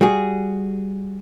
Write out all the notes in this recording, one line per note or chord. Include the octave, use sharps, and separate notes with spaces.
G3 F#4 G#4